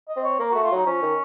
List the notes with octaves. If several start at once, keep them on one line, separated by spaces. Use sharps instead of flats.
D#5
C4
C#5
A#3 A#4
A3 F#4
F4
F#3 D#4
F3 C#4
D#3